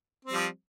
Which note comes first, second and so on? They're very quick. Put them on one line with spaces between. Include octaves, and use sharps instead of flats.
C4 G3 F3